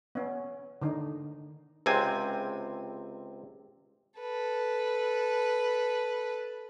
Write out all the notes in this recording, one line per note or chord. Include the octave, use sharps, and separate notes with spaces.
B3 C#4
D3 D#3 D#4
C#2 C3 C4 G#5
A4 B4